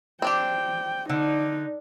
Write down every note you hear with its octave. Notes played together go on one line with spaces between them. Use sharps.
C4 D4 G4 G5
D3 D#4